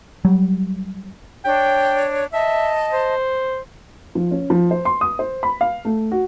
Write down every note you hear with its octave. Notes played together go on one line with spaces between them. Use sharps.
F#3 G3
D4 C#5 G5
D#5 E5 A5
C5
F3
C#4
F3
C5
C6
D#6
C5
B5
F5
A3
F#4